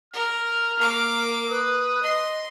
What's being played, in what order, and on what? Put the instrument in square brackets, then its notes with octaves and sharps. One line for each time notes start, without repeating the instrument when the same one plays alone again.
[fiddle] A#4 [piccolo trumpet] F6
[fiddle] A#3 D6 [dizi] A#4
[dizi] B4 [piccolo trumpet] D#6
[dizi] D#5 [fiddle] C6